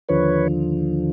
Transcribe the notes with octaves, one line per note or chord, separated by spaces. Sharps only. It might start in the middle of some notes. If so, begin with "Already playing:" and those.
D#2 D3 F3 B4 C#5